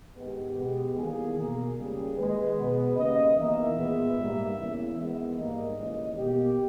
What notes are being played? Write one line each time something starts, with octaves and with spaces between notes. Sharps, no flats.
G#2 D#3 G#3 B3 G4
B2 G#3 B3
E2 D#3 G3 A#3 G#4
B2 A#3 G#4
C#2 C#3 G3 A#3
D#2 D#3 G#3 B4
B2 G#3 B3
D#2 C#3 G3 A#3 D#5
E2 D#3 A#3 E5
A#2 G#3 B3
G#2 G3 A#3
E2 C#3 E3 A#3
E2 D#3 G#3 B3
G#2 G3 A#3 D#5
D#2 C#3 E3 G#3
B2 A#3 G4